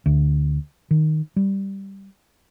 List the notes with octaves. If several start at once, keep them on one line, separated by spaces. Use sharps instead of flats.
D2
D#3
G3